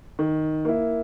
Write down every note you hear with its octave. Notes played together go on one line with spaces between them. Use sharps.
D#3
A#3 E4